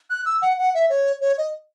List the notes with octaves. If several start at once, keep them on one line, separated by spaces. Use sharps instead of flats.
F#6
E6
F#5
F#5
E5
C#5
C#5
D#5